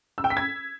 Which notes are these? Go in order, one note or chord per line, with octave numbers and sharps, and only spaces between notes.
E6
G5
B6
G#6